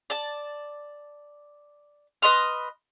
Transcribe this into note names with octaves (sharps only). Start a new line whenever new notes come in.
D5 A5
B4 D#5 C6 F6